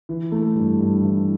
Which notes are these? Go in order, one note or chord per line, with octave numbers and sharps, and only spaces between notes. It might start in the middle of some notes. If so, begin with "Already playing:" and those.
E3
A3
G2
G2
E3